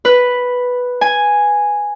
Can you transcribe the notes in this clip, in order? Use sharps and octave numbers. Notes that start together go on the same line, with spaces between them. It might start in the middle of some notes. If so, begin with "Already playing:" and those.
B4
G#5